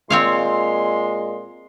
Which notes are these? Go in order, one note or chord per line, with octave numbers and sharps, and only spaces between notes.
A#2 G#3 C4 C#5 F5 C6